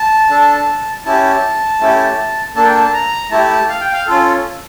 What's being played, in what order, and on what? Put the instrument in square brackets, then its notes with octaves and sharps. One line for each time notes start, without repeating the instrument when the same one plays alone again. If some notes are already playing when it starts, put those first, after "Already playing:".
Already playing: [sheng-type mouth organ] A5
D4 A4
C#4 E4 G4 A5
A3 C#4 E4 G4
A#3 D4 A4 A5
G5
A5
A#5
A3 E4 G4 A5
F5
G5
F5
C#4 F4 A4